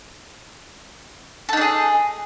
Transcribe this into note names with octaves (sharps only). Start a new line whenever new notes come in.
D4 D#4 G#4 A4